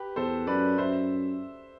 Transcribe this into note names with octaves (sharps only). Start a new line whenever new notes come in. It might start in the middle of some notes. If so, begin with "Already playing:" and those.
Already playing: G4 B4
E2 A4 C5
F#2 B4 D5
F#2 C5 E5